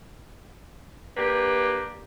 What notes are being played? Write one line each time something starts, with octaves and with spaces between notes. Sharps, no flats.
A#3 D4 G4 B4